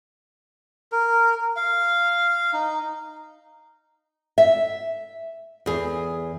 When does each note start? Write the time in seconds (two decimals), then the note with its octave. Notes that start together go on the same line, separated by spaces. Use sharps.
0.92 A#4
1.56 F5
2.53 D#4
4.38 E5
5.66 E2 G#4